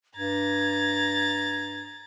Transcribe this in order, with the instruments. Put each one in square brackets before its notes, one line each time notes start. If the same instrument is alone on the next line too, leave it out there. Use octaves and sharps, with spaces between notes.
[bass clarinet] G2 [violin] A#5 A6 [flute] G#6